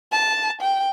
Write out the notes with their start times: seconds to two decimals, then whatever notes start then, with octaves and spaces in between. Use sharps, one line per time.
0.12 A5
0.62 G5